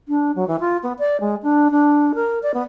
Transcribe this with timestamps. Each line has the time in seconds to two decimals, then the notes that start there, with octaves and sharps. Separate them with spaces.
0.08 D4
0.35 F#3
0.47 E3
0.60 F4
0.83 B3
0.99 D5
1.20 G#3
1.43 D4
1.71 D4
2.14 A#4
2.43 D5
2.54 B3